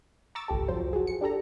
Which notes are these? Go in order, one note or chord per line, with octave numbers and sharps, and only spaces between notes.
A#5 C#6 D6 E6 A6
G#1 C#2 G4 A4
F2 F3 F#3 C5
F#4 G#4
C#7
D4 G4 A4 A#5